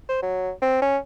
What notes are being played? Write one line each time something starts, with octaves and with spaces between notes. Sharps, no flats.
C5
F#3
C4
C#4